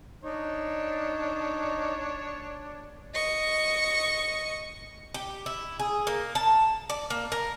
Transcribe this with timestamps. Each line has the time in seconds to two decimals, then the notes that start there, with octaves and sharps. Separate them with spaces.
0.24 D4 D#4 C#5
3.14 D#5 C#6
5.14 G4
5.46 E4
5.79 G#4
6.07 A#3
6.35 A5
6.90 D5
7.10 A#3
7.32 A#4